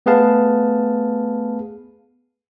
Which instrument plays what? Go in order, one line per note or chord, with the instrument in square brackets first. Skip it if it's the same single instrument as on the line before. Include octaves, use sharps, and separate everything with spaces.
[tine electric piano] A3 B3 G#4 B4 F5 A5